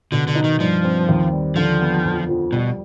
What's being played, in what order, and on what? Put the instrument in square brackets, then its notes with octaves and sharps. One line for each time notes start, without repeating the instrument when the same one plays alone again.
[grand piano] B2 [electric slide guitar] D3
[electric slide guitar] D3
[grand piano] D#4
[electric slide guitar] D#3
[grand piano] G2 [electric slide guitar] F3
[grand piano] C4
D#2
G3
[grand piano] D3 [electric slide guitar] F3
[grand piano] B3
F2
F3
[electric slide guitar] B2 [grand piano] G3